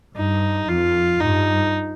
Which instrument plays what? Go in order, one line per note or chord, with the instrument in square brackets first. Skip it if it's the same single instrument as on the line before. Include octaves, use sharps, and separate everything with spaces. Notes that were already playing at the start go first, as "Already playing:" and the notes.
[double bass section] G2 [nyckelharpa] D#4
[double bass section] F2 [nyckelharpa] F4
[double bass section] G2 [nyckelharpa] D#4